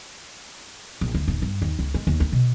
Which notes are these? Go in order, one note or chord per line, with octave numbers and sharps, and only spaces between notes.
A#1
D2
D#1
G2
D#2
C#2
G#3
D#2
D2
B2